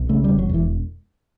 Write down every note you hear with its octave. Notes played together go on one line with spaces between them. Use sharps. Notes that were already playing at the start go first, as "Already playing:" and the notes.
Already playing: B1
C#3 A3
G3
E1
F#3
E1 E3